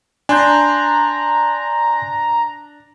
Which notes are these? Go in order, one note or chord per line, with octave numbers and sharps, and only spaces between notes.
D4 G#5 A#5 C6 G6